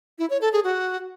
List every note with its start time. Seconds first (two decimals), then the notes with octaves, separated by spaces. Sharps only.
0.19 E4
0.30 C#5
0.41 A4
0.53 G#4
0.64 F#4